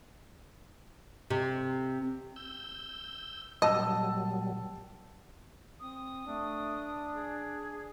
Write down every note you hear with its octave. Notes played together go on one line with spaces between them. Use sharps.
C3
E6 G6
A#2 F#3 G3 D#5 A5 E6
C4 D#6
A3 D4
G#4